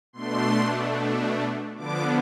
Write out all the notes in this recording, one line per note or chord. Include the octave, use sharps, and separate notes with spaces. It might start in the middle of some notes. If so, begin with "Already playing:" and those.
B2 A3 D4 C6
D3 F3 B3 D4 D6